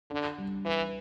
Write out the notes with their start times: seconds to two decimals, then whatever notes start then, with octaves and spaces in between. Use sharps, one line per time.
0.10 D3 D4
0.38 G3
0.65 E3 B4